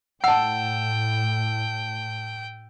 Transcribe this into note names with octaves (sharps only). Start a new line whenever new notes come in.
A2 F#5 G5 A5 E6